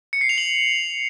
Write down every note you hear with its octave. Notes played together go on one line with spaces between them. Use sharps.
C#7
C7
F7
F#7